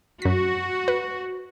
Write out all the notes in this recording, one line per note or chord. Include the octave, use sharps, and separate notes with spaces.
F#2 F#4 B6
B4